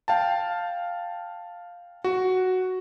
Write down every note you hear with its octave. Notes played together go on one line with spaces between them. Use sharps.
F5 G5 A5
F#4